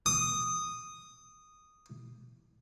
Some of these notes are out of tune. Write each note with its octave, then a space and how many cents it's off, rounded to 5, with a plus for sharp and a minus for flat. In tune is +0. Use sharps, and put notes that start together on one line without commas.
D#6 -5